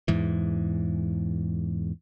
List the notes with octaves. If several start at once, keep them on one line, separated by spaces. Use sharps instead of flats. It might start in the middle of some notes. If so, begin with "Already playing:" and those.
E2 G#2 E3